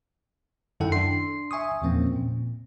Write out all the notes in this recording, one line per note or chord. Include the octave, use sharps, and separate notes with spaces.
F#2 D#3 E4 A4 F#5 G5
D4 C6 C7
E5 G#5 C#6 D#6
E2 A#2 F3 A#3 C4 C#4
A#2